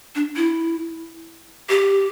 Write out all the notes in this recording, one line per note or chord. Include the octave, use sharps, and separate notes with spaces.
D4
E4
G4